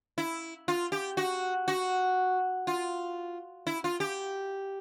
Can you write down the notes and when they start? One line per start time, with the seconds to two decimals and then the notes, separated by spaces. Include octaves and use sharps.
0.18 E4
0.68 F4
0.92 G4
1.17 F#4
1.68 F#4
2.67 F4
3.67 E4
3.84 F4
4.00 G4